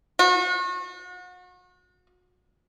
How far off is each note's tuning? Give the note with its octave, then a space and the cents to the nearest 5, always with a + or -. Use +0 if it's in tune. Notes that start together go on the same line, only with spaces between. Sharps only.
F#4 -35